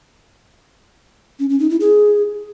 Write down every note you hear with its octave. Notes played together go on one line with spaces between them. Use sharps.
C#4
C#4
D#4
E4
G#4